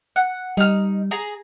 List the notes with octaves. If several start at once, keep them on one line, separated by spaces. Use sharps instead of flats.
F#5
G3 D#4 F6
G#4 A#5